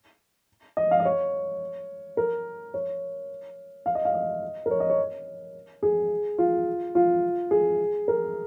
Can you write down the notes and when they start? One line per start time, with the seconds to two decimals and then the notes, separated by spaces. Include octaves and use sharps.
0.77 D#5
0.91 F5
1.00 D#5
1.05 C#5
2.17 A#4
2.74 C#5
3.86 F5
3.95 D#5
4.05 F5
4.14 D#5
4.66 A#4
4.71 C#5
4.80 D#5
4.90 C#5
5.83 G#4
6.38 F4
6.95 F4
7.51 G#4
8.08 A#4